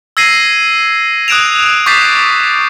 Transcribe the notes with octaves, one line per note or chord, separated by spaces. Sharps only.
E6 G#6 A#6 C7 D#7 F#7
D#6 F#6 G#6 D7 E7 F7
C#6 D6 G6 A6 B6 C7